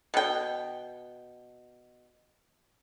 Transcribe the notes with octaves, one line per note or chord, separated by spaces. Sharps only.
B2 G5